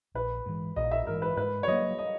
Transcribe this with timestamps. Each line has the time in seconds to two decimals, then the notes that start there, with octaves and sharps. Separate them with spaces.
0.15 A#1 B4
0.46 G#2 E3
0.76 A#1 D#5
0.91 E5
1.07 G#2 E3 A#4
1.22 B4
1.37 G#2 B4
1.63 C#5
1.68 F#3 A#3 D#5
1.99 D#5